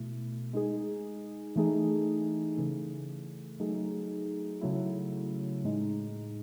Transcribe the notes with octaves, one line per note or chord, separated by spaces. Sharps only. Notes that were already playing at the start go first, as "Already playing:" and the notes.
Already playing: B2 A3 E4
G#3 D#4 G#4
E3 A3 D#4 G#4
C#3 E3 A3
F#3 A3 D#4 G#4
C#3 F#3 A3 E4
A2 G#3 D#4